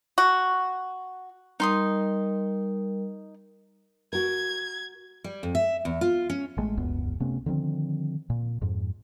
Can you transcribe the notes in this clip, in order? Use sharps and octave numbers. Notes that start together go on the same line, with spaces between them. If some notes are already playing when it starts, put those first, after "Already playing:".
F#4
G3 D#4 A#4 C6 D#6
F#4 A#4 G#6
G3
F2
E5
E2
F4
C#4
A1 G#3 A3
E1 C#2 F#2 B3
C3 A3 B3 C#4
D3 D#3 F3 C4
A#2
F2 G#2